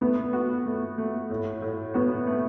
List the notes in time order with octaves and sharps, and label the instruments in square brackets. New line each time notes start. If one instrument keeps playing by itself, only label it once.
[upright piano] A3 [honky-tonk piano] B3
[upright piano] F#4
A3
A3
A2
A2
[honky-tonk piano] B3 [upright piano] F#4
[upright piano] A3